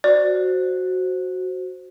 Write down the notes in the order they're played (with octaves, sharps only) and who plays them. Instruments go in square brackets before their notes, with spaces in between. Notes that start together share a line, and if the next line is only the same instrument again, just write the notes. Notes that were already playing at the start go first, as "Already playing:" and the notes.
[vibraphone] F#4 C5 [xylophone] D5